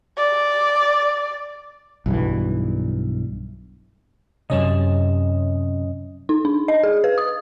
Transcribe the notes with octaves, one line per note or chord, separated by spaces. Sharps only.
D5
B1 G2 E3
F#2 C3 C#4 D#5 A5
D#4
D4
D#5
G#4
B4
D#6